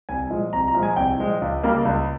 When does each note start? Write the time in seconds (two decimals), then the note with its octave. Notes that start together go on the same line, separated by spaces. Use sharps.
0.09 C2 G#5
0.30 A#2 F3 G#3
0.53 C2 A#5
0.68 A#5
0.74 A#2 F3 G#3
0.83 G#5
0.96 C2 G5
1.19 A#2 F3 G#3
1.42 C#2
1.63 C#3 G3 A#3
1.85 C#2